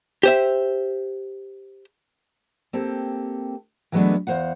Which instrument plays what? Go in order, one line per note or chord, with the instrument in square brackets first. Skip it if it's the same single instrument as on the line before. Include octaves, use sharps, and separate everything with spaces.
[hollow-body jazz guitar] G4 C5 E5
[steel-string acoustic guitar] A#3 C4 G4 A4
E3 F#3 G#3 A3 B3 D4
E2 C5 F5 F#5